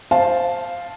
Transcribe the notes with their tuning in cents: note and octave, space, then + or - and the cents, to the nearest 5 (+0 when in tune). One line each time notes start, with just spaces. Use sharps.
C5 +0 F5 +0 A5 -5